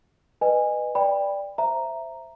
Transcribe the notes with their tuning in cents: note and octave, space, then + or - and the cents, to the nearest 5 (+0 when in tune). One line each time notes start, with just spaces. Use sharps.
B4 +0 D#5 -25 G#5 -15
D5 +0 G5 +20 B5 +0
C5 +0 E5 +15 A#5 +0